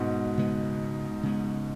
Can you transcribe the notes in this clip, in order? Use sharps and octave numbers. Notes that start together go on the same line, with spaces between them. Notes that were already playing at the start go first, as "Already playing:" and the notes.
Already playing: G#2 B2
C#3 G#3 B3
C#3 G#3 B3